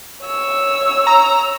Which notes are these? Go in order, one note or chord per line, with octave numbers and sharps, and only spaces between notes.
C#5 E6
A#5